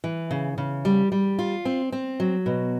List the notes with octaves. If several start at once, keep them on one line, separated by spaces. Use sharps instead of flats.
E3
C#3
C#3
G3
G3
F4
C4
C4
F#3
B2